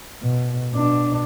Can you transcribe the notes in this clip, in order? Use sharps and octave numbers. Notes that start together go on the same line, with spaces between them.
B2
B2 D4